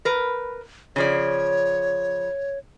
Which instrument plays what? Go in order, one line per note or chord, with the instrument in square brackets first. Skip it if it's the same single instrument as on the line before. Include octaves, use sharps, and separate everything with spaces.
[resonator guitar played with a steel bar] A#4 B4
[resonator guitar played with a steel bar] C#3 F3 D5 [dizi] C#5